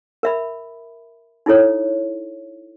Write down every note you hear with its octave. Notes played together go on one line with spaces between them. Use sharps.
A#4 E5 B5
D#4 E4 A4 C#5